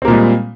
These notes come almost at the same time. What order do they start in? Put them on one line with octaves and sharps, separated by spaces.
C4 A#3 A#2 G#3 G3